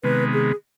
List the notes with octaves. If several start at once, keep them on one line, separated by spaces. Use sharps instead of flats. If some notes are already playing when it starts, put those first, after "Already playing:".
C3 D#3 G#3 B3 B4
G#4